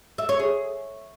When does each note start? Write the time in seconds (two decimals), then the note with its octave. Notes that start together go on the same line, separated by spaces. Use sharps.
0.18 E5
0.29 C#5
0.39 G#4